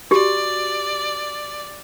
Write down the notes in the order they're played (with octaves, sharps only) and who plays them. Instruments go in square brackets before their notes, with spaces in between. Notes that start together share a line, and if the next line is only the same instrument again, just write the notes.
[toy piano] F#4 G4 [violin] D5